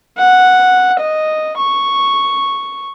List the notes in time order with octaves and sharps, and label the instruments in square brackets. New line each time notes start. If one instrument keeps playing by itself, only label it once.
[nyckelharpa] F#5
D#5
C#6